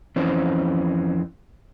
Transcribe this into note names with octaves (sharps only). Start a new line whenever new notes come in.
F2 E3 C4 C#4